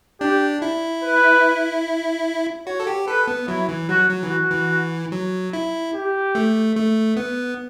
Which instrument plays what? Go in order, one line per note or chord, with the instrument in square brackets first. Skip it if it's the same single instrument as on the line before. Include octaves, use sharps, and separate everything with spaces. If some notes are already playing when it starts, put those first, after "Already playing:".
[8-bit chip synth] D4 [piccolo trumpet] G4
[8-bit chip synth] E4
[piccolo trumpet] B4
[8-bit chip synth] F#4 [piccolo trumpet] C#5
[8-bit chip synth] A4
G4
[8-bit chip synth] A4 [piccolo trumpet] B4
[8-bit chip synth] B3
[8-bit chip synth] F#3 [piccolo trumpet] E4
[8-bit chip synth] E3
[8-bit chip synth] F#3 [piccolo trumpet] F#4
[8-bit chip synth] F#3
E3
[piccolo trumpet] F#4
[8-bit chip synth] E3
F#3
E4
[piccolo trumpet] G4
[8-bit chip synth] A3
A3
B3